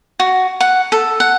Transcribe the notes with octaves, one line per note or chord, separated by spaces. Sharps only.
F#4
F#5
A4
F#5